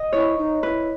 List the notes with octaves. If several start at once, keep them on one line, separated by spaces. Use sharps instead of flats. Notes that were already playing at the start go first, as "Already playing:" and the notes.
Already playing: D#5
E4 C#5
D#4
E4 B4